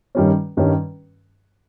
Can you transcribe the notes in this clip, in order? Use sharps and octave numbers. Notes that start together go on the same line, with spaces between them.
G2 D#3 G3 C#4
G2 D#3 G3 C#4